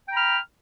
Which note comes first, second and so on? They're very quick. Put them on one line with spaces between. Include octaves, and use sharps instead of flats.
G5 A#5 B5 F6